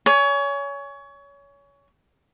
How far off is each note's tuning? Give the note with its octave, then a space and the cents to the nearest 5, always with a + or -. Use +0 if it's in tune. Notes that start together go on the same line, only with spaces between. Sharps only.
C#5 +25 G#5 +0